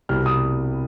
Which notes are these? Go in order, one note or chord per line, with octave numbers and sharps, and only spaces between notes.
C2 B2 G3 F6
D#6